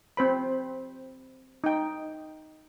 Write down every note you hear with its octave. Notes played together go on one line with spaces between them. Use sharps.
C4 C5 B5
D#4 G5